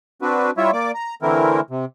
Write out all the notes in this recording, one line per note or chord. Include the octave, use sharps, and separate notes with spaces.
C4 D4 F#4 B4
G3 E4 F4 C#5 E5
A#3 D5 D6
A#5
D3 E3 A3 C4 E4 A#4
C3